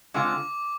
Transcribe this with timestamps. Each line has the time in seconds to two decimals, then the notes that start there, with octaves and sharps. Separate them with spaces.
0.14 D3 G#3 C4 F4 D6